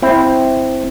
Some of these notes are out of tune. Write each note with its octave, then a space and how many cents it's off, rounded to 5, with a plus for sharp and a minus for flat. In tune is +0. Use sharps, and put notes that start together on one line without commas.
C4 +0 E4 +0